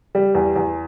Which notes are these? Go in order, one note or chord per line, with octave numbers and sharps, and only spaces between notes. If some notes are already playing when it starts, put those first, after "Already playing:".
G3
E2
E2